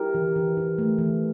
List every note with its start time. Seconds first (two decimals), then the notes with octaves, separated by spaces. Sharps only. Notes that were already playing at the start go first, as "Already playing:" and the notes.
Already playing: E4 G4 A#4
0.15 E3
0.36 E3
0.57 E3
0.78 A3
0.98 E3